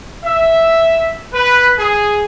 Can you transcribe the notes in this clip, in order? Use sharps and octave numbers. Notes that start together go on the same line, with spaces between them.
E5
B4
G#4